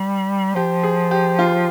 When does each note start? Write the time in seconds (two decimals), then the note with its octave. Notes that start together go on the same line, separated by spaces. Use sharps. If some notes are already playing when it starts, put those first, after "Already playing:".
Already playing: G3
0.55 F3 G4
0.83 G#4
1.11 G4
1.39 F4